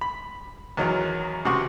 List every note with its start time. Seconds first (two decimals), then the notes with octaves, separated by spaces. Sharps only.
0.01 B5
0.77 E2 D#3 F#3
1.45 C#2 C3 F#4 F#5 C#6